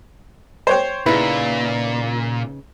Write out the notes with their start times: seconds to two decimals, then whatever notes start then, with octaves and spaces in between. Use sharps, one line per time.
0.67 C5 C#5 G5
1.06 A#2 C#3 D#4 E4 B4